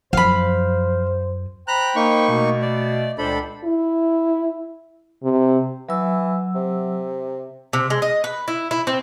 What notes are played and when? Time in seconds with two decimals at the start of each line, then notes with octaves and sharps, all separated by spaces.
0.13 F#2 F3 C5 F5 B5
1.68 C5 G5 A#5 B5 F#6
1.96 A#3 D#4 C#6
2.28 B2 A3
2.62 D5
3.18 C#2 A#2 D4 A4 C5 B5
3.64 E4
5.24 C3
5.89 E3 F#3 E6
6.55 C3
7.73 C3
7.90 G#3
8.02 D#5
8.24 B4
8.48 E4
8.71 E4
8.87 C4